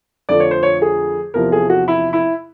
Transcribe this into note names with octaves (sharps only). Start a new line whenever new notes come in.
F2 D3 F3 A3 D5
C#5
C5
C#5
G#4
E2 C3 F3 A#4
G#4
F#4
E4
E4